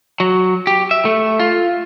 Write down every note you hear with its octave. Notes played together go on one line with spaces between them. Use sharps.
F#3
G4
E5
A3
F4